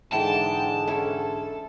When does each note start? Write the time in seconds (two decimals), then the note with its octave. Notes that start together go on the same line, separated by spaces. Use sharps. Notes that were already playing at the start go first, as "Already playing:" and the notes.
0.13 G#2 D3 E3 G5 A5
0.87 C#4 E4 A4